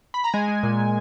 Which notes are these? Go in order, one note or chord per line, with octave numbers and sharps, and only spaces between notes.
B5
A#5
G#3 G#5
G#3
A#2
A#2